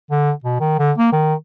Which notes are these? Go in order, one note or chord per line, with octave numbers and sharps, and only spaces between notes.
D3
B2
D#3
D3
A#3
D#3